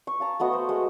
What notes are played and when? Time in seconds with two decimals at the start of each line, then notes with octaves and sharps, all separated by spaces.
0.07 C#6
0.20 F5 A5 A#5
0.40 A3 B3 F#4 D#5
0.53 C5
0.69 G#3